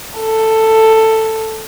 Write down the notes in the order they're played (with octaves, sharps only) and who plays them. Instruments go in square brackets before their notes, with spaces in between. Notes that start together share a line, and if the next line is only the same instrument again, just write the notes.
[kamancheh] A4